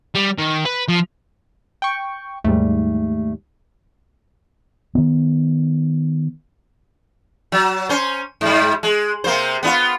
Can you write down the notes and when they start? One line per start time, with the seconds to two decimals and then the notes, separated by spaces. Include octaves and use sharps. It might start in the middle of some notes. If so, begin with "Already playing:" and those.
0.15 G3
0.38 D#3
0.65 B4
0.88 F3
1.82 G5 C#6
2.44 D#2 G#2 G3 A3
4.95 D#3 B3
7.52 F#3
7.89 C#4 C5
8.41 G#2 G3
8.83 G#3
9.24 C3 A#3 C5
9.63 B3 D4 F4